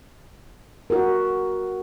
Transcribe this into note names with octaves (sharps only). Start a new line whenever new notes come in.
F#4 A#4